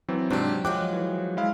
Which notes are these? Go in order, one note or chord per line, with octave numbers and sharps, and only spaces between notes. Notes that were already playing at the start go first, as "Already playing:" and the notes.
E3 F#3 C4
G#2 C3 F#3 D4 G4
F3 F#3 G#3 G5 D6 F#6
E3
G#3 E4 F5